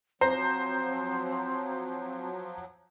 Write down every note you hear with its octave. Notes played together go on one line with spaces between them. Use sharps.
F3 F#3 C4 C5 A#5 C6